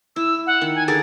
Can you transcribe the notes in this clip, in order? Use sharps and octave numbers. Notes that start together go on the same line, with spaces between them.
E4 E6
F#5
D#3
G#5
D3 G#4 A#4 A6